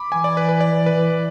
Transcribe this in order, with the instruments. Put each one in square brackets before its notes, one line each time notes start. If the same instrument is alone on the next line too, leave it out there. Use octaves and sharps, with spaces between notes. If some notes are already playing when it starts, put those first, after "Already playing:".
Already playing: [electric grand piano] B5 D6
[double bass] E3 [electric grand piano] G#5
[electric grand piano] D5
B4
B4
D5
B4